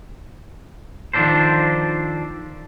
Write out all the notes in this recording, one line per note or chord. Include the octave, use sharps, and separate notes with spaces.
D#3 F3 F#3 D4 A4 C5